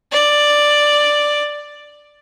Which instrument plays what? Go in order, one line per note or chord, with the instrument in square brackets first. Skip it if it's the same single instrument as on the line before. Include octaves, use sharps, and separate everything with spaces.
[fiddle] D5